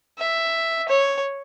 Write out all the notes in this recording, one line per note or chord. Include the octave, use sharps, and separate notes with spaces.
E5
C#5